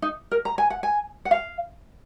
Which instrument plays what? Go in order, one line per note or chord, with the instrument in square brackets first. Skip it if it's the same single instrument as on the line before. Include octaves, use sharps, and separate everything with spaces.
[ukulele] D#4
A#4
A#5
G#5
F#5
G#5
F#5
F5